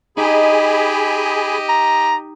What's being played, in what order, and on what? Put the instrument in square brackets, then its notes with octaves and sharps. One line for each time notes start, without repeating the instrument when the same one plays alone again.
[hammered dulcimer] D#4 [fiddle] G4 D#5 [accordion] G#4 G#5 B5
[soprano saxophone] A#5